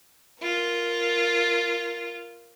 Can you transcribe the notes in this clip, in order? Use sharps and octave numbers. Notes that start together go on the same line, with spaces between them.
F4 A#4